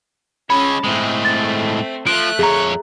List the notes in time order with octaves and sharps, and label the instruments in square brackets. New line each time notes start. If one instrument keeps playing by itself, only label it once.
[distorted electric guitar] G#3 C#5 [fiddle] C#4 A5 [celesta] B5
[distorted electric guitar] A2 G#3 [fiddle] A3 C4
[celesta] A6
[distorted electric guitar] F3 [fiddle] A3 F#6 [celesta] D7
[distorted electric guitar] F2 C#5 [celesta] G#4 A#5